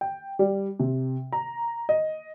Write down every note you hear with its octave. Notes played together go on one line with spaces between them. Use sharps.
G5
G3
C3
A#5
D#5